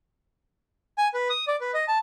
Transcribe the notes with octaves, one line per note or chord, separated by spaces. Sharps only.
G#5
B4
D#6
D5
B4
D#5
A5